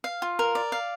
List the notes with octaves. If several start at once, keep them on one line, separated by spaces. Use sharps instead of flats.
F5
F4
A#4
D5
F5